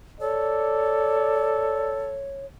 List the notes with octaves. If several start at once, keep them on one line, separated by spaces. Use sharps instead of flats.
A4 C#5 D5